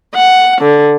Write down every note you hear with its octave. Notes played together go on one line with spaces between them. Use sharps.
F#5
D3